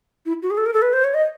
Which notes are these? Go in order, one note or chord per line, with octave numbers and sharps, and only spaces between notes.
E4
F#4
G#4
A4
A#4
A4
B4
C5
C#5
D#5